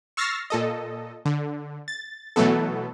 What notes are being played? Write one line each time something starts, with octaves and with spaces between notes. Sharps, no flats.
C#6 E6 F6 A6 A#6 C7
A#2 A4 D#5
D3
A6
B2 E3 F#3 A3 B3 A4